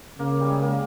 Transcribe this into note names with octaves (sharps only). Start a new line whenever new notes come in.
C#3 A#3
G3
G#3
A#3